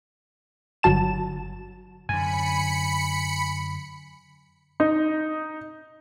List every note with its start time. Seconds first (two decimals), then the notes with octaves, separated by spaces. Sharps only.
0.83 G1 F#3 A5 E7
2.09 F#2 D3 G#5 B5 C#7
4.80 D#4